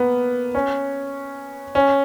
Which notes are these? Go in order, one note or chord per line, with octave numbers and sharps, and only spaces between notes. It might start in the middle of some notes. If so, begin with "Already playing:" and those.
Already playing: A#3 B3
C#4
C#4